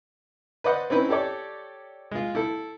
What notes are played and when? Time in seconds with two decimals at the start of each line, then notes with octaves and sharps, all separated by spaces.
0.64 B4 C5 D5 D#5 F#5
0.90 C4 C#4 D#4 E4 B4
1.09 G4 A4 C#5 D5
2.11 G#3 F4
2.35 E4 A4